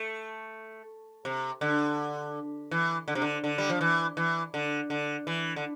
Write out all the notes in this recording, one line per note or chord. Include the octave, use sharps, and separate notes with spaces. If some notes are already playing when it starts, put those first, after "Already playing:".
Already playing: A3
C3
D3
E3
D3
C3
D3
D3
G3
F3
E3
E3
D3
D3
E3
D3